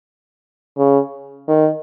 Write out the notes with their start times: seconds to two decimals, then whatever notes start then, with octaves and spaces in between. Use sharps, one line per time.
0.78 C#3
1.48 D#3